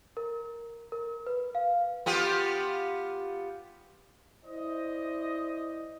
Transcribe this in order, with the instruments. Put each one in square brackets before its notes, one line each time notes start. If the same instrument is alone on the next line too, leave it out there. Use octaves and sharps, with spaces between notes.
[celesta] A#4
A#4
B4
F5
[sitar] B3 F4 G4
[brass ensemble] E4 C5 D5 D#5